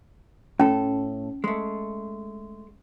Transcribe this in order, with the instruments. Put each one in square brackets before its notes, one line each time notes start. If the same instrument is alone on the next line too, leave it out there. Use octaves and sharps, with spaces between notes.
[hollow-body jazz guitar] A2 A4 [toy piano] C#4
[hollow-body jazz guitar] G#3 A3